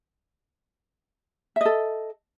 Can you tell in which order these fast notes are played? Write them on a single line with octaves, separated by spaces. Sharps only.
E5 D#5 A4